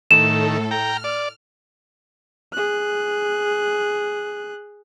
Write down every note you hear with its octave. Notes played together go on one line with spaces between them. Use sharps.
A2 D#3 A3 A4 E7
G5 A#5 F6
D5
G#4 F#6